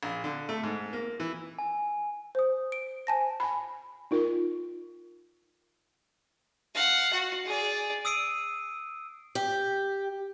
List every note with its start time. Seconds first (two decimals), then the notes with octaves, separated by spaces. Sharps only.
0.03 A#1
0.24 D3
0.49 A3
0.63 G#2
0.93 A#3
1.20 E3
1.59 G#5
2.35 C5 D#6
2.72 D7
3.07 C5 G#5 A5 A#6
3.40 G#5 B5
4.11 D#4 F4 A#4
6.75 F5 F#5
7.13 F#4
7.45 G#4 D5
8.05 D#6 E6 C7 D7 D#7
9.35 G4